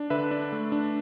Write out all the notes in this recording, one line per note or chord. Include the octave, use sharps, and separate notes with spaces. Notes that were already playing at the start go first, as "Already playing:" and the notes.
Already playing: D4
D3 B4 E5
D4
A3
D4